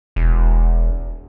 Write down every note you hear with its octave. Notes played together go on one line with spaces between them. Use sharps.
E1